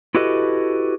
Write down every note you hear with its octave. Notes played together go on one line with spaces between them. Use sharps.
E4 F#4 G4 A4 B4 D#5